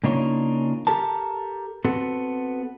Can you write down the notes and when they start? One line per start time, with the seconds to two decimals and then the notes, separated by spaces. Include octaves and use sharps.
0.04 C#3 A#3 D4 D#4 F4 C#5
0.87 G4 A4 A#4 A5
1.85 B3 C4 F#4 A4